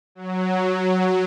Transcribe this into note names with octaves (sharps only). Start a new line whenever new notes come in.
F#3